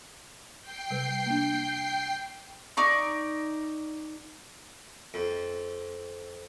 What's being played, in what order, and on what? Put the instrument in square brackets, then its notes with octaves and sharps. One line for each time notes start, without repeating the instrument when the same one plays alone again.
[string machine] G5 C7
[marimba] C3 G3 B4
A#3 D4
[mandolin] D#4 D5 C#6
[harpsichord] F2